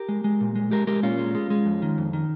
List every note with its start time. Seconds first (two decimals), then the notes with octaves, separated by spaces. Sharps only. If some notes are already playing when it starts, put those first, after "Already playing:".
Already playing: G4 A#4
0.09 G#3
0.24 G#3
0.41 A#2
0.56 G#3
0.71 G#3 G4 A#4
0.87 G#3 G4 A#4
1.03 A#2 C#4 F4
1.19 G#3
1.35 G#3
1.50 G#3
1.66 F2
1.82 D#3
1.98 F2
2.13 D#3